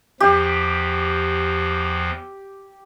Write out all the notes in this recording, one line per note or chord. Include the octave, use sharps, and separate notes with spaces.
E2 F3 G4